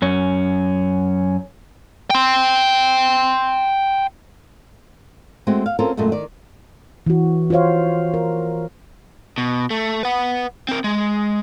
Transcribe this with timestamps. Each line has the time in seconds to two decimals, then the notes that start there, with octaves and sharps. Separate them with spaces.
0.02 F#2 C#4
2.10 G5 C6
5.47 G#3 A3 C4 F#4
5.66 F5
5.79 C4 C#4 F4 A4 A#4
5.97 F#2 A#2 G#3 A3
6.12 D#3 D5
7.06 E3 F#4
7.50 F4 F#4 C5 C#5 F5
8.14 A#4
9.38 B2
9.70 A3
10.03 B4 F#5
10.69 C4 A#4
10.84 G#3